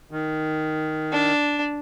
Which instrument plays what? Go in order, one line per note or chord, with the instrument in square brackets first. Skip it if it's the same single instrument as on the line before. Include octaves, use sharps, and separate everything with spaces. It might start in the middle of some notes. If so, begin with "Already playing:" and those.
[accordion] D#3
[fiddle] D4